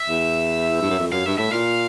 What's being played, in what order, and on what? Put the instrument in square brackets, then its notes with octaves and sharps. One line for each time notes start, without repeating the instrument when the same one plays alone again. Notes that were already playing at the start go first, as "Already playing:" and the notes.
Already playing: [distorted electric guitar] E5
[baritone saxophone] E2
G2
F#2
F2
[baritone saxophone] F#2 [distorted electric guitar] F5
[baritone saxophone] G2 [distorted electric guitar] E5
[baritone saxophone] A2 [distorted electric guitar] E5
[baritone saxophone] A#2 [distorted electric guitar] F5